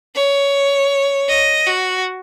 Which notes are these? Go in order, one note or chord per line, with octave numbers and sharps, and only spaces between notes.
C#5
D#5
F#4